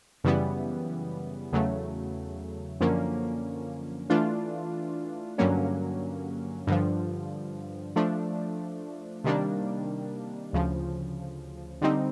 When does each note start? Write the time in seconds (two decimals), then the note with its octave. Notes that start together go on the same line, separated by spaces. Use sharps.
0.24 F#2 C#3 E3 G3 B3
1.52 E2 C#3 F#3 A3
2.81 F#2 D3 F3 A#3 C#4
4.10 E3 A3 D4 F4
5.38 G2 D3 F#3 A#3 C#4
6.67 G2 D3 F3
7.96 F3 A3 D4
9.24 C3 D#3 G3 A#3 D4
10.53 D2 C#3 F3
11.81 D3 G3 C4 D#4